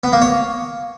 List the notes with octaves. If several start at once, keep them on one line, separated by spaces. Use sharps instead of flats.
B3
A#3
C#5